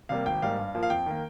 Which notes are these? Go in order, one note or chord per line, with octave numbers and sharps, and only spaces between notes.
C3 G3 A#3 F5
G#1 G5
G#2 G3 A#3 F5
G2
F3 A#3
F5
F2 G5
D#3 A#3